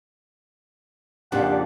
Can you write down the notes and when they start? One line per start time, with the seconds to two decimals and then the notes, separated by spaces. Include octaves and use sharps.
1.32 F2 A#2 C#3 D4 G4 F#5